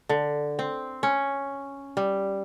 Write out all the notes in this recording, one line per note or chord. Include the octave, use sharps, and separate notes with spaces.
D3
C4
C#4
G3